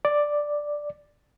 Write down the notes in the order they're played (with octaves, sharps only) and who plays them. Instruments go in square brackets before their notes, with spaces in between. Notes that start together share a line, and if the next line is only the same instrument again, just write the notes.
[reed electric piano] D5